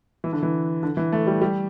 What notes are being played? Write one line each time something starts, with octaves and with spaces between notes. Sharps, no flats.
E3
D3
E3
D3
E3
A3
G3
G3